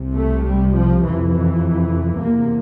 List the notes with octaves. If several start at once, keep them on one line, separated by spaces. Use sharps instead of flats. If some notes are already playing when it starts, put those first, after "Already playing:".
Already playing: C2 C3
A3
G3
F3
F2 C3 E3
E3
E2 C3 A#3